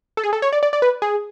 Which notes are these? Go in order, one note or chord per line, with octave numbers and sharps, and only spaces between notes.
A4
G#4
A4
C#5
D5
D5
D5
B4
G#4